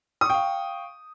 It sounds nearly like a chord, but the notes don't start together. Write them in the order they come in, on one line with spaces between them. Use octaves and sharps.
D#6 C#6 G5 F5